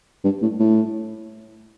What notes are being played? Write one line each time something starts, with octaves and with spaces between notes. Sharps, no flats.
G2
A2
A2